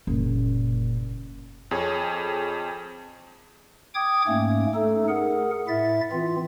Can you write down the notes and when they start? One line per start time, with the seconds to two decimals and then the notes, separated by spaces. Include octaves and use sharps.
0.07 F#1 A#2
1.71 F2 G#4 C#5
3.95 G5 D6 D#6 G#6
4.28 G#2 A3 A#3 C#4
4.75 A3 D#4 A4
5.08 G#4 A#4 F#5
5.68 A2 E4 E5 A6
6.12 E3 C4 F4